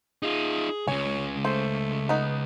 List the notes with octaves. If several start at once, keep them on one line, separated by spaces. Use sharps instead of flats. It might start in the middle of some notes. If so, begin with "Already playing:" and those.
D#4 F4 G#4
C#2 C#3 C#5 G#5
A3 C5
B3 D#4